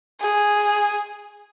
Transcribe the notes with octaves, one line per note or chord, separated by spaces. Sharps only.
G#4